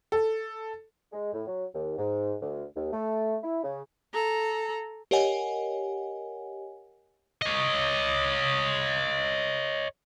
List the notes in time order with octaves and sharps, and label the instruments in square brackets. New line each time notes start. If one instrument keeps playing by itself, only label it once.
[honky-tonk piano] A4
[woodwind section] G#3
A2
F#3
D#2
G#2
D2
D#2
A3
E4
C#3
[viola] A4 A#5
[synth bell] G4 A#4 C#5 D#5 F#5 G#5
[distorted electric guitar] C#5 D#5